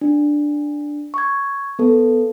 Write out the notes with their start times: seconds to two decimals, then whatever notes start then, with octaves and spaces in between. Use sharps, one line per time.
0.01 D4
1.14 C#6 G#6
1.79 B3 A4